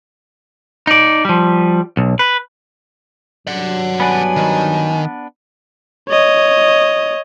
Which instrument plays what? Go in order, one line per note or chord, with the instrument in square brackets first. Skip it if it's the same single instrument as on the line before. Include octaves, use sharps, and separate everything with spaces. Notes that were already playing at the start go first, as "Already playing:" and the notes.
[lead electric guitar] D#4 D5
F3 G3
B1
B4
[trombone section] G2 F#3 [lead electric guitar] D5 F#5
[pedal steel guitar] B3 D4 B4 [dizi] G#5
[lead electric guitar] D#3
[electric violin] C#5 D#5